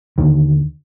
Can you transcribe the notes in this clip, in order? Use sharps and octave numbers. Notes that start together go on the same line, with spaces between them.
D#2 D3 D#3